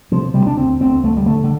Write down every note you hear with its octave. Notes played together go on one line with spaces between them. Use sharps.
C3 F3
C3 G3
D4
D2 C4
D2 C4
D2 A3
G3
D3 A3
D3